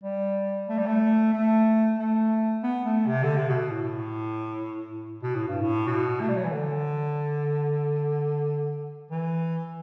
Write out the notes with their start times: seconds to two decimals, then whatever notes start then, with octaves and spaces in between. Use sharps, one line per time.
0.03 G3
0.68 A3
0.77 G3
0.86 A3
1.33 A3
1.98 A3
2.63 B3
2.85 A3
3.06 C3
3.23 D3
3.37 C3
3.49 B2
3.71 A2
5.23 B2
5.35 A2
5.48 G2
5.61 A2
5.87 B2
6.21 A3
6.28 G3
6.36 F#3
6.44 E3
6.52 D3
9.10 E3